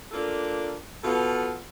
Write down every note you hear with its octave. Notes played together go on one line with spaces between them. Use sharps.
A#3 D4 F4 A4
B2 B3 F4 A4